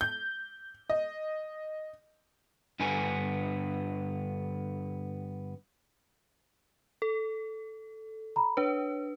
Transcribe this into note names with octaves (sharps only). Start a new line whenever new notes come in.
G6
D#5
G2 D3 B3 G#5
A4
A#5 B5
D4 B4 C#5